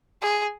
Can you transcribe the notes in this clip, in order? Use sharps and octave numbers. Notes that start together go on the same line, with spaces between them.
G#4